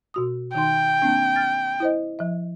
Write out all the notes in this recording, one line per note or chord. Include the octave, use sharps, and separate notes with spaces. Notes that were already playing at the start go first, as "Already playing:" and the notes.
B2 F#4 D#6
D#3 D#4 G5 C6
A#3 C4 D4
F6 A6
E4 C5 D#5
F3 E5